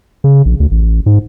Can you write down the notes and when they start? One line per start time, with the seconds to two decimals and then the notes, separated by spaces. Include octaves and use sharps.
0.24 C#3
0.45 A#1
0.60 D2
0.71 A1
1.06 G#2